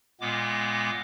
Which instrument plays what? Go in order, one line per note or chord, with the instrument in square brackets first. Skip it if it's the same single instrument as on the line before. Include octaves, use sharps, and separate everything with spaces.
[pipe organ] A#2 G#3 B3 D6